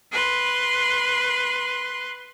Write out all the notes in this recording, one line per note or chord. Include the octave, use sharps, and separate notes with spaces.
B4 C6